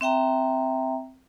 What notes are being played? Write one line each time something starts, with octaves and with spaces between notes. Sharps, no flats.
C4 E5 G5 A#5